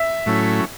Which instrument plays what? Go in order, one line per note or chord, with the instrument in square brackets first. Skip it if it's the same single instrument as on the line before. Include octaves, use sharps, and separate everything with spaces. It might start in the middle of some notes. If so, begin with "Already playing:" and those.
Already playing: [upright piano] E5
[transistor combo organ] A2 F#3 A3 C#4 E4